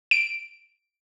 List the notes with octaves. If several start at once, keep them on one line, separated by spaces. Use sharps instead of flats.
D7